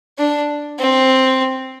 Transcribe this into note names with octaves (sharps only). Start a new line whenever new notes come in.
D4
C4